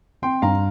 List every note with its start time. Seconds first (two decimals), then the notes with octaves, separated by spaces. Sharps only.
0.22 C4 G5 C6
0.42 G2 F5 A#5